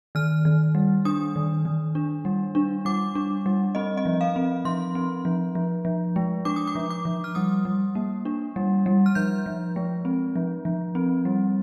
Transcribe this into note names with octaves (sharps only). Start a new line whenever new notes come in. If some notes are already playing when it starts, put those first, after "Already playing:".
D#3 F6
D#3
G3
D4 D#6
D#3
D#3
D4
G3
D4
G3 D6
D4
G3
C4 D#5
D#5
F3
F5
C4
F3 C6
C4
F3
F3
F3
G#3
D4 D6
D#6
D6
F3
D6
F3
F6
G3 D#6
G3
A#3
D4
G3
G3
F6
F3 G6
F3
G#3
C4
F3
F3
C4
G3